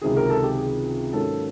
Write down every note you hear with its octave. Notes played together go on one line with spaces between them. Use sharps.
C#2 C3 D#3 F#3 G#4
A#4
A4
G4
G#4
G#2 D#3 F#3 A#3 C#4 A4